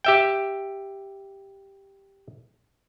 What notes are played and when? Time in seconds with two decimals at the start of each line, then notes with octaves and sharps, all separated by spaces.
0.04 G4 E5 G5